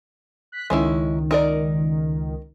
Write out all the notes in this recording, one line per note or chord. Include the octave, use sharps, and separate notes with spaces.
F#6 B6
C#2 D#3 G#3 C#4 E4
D#4 A#4 D5